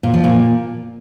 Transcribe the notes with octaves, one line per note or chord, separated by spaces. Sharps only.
A#2
F3
A#2